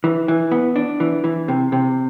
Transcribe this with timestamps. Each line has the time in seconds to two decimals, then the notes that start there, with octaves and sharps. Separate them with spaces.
0.04 E3
0.28 E3
0.51 B3
0.76 D4
1.00 E3
1.24 E3
1.48 C3
1.72 C3